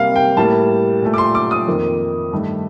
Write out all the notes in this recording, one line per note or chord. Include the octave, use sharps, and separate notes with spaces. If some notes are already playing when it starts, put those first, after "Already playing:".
Already playing: C3 G3 A#3 F5
G5
A2 G3 A#3 A5
A#2 A3
D6
C6
D6
D#6
F2 D#3 A#3
G2 D#3 A3